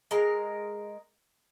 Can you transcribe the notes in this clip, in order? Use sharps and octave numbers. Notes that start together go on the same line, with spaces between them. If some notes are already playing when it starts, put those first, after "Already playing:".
G#3 A#4 A#5